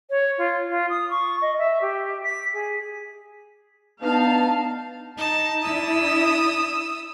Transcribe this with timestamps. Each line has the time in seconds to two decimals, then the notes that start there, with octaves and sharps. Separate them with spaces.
0.10 C#5
0.37 F4
0.70 F4
0.89 D#6
1.10 C#6
1.41 D#5
1.58 E5
1.81 G4
2.23 B6
2.53 G#4
4.02 B3 D4 D#4 B4 F5 A5
5.18 D#4 A5
5.63 D4 E4 D#6 E6